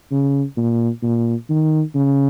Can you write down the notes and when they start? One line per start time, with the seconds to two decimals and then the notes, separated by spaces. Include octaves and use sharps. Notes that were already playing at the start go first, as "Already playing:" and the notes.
0.11 C#3
0.57 A#2
1.03 A#2
1.50 D#3
1.95 C#3